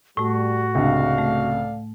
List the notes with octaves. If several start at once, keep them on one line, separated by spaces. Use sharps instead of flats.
A2 G3 A3 F#4
C#2 C3 D4 A4 D5 F5
A3